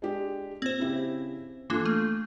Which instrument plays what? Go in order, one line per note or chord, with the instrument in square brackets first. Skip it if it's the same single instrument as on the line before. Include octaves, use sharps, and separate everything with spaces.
[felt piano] G#3 D4 G4
[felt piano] A#2 [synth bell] C4 C5
[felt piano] C#3 E4 G4
[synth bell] E3 A#3 D4 [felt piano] F4 A4 C6
[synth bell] A3